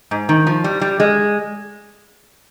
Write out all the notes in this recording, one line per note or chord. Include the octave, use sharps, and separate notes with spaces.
G#2
D#3
F3
G3
G3
G#3